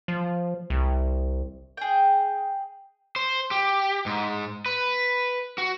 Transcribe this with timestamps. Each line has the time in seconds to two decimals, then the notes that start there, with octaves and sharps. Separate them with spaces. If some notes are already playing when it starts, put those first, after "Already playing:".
0.08 F3
0.70 C2
1.77 G#4 G5
3.16 C5
3.51 G4
4.06 G#2
4.66 B4
5.58 F#4